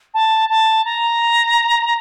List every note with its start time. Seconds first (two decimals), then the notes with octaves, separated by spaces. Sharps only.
0.14 A5
0.49 A5
0.85 A#5